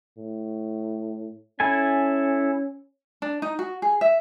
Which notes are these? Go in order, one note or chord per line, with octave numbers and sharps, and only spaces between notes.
A2
C#4 E4 A4 G#5
D4
D#4
F#4
G#4
E5